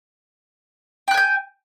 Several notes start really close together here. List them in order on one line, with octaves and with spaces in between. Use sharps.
G5 F#6 G#5 G6